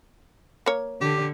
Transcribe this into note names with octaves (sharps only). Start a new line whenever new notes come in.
A#3 C#5
D3 G4